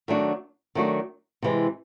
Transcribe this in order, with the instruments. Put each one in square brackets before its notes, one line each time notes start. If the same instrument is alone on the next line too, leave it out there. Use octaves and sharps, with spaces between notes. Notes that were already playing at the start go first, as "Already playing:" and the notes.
[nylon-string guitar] D#3 F#3 A3 D4 F#4
D#3 F#3 A3 D4 F#4
C3 E3 G#3